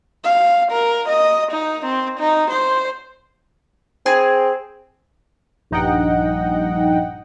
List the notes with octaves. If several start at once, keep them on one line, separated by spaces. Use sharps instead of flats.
F5
A#4
D#5
D#4
C4
D#4
C5
C4 G#4
A#1 G2 D#4 D#5 F#5 G5